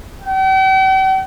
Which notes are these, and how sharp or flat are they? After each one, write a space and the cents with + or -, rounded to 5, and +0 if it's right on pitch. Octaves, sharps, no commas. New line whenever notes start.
G5 -45